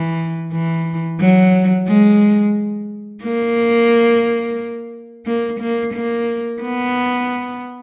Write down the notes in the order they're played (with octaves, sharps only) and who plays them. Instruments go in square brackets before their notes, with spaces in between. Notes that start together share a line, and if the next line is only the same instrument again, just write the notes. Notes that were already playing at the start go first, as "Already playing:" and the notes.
Already playing: [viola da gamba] E3
E3
F#3
G#3
A#3
A#3
A#3
A#3
B3